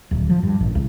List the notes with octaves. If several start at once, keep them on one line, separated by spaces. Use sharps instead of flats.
D1
F3
G2
A1
C2